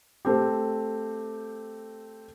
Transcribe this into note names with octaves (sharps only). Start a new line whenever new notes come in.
A3 C4 G4